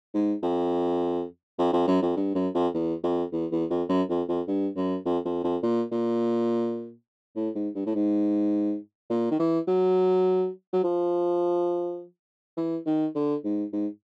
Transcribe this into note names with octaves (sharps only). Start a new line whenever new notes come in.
G#2
F2
F2
F2
F#2
F2
G2
F#2
F2
E2
F2
E2
E2
F2
F#2
F2
F2
G2
F#2
F2
F2
F2
A#2
A#2
A2
G#2
G2
A2
G#2
A#2
D#3
E3
F#3
F#3
F3
E3
D#3
D3
G#2
G#2